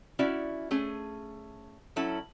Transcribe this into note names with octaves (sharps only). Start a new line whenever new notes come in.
C#4 E4 F#4 D5 E5
A3 C#4 G#4
F#3 C#4 E4 A4